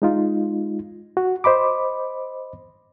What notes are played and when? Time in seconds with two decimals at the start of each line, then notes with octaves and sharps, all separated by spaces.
0.02 G#3 D#4 F4
1.17 F#4
1.44 C5 D#5 B5 D6